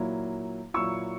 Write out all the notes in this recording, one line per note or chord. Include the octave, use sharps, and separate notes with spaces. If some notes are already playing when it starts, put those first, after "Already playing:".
Already playing: A#2 F#3 A#3 E4
A#2 F#3 A#3 E4 C#6 E6